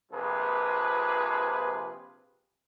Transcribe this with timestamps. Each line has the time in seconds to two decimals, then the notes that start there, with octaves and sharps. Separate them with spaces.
0.12 A#1 C3 F3 G#4 B4